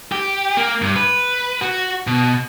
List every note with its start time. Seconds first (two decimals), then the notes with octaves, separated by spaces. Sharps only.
0.12 G4
0.57 A#3
0.82 G2
0.96 B4
1.61 F#4
2.07 B2